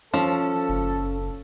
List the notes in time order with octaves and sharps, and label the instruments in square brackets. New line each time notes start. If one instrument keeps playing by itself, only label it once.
[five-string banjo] F3 [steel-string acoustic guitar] C#4 [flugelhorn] A4
[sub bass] F#1